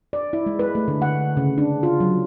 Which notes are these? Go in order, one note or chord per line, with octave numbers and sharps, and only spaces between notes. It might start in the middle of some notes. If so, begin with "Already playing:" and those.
D5
E4
G#3
B4
A3
D3
F#5
C#3
D4
F4
F#3